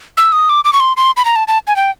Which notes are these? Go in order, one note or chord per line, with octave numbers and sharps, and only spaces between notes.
E6
D#6
D6
D6
C#6
C6
C6
B5
A#5
A5
A5
G#5
G5